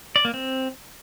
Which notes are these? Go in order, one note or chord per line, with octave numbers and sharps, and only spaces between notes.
D5
A#3
C4